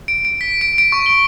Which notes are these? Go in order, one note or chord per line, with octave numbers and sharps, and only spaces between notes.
D7
D7
B6
D7
D7
C#6
G7